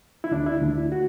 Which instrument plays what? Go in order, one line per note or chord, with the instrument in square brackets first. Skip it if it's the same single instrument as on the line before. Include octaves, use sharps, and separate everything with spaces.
[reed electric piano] E4
D2 D4
E4
D2 D4
E4
F#4